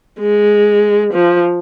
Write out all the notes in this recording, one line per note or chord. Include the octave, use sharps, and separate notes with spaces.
G#3
F3